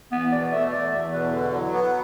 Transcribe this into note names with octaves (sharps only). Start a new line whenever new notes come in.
E2 B3
B2 D5
A3 E5
E2 D5
E2 E5
B2 B4
D3 A4
F#3 E4
B3